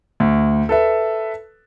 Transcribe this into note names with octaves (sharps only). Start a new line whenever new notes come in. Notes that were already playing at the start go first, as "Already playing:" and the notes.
D2
A4 B4 E5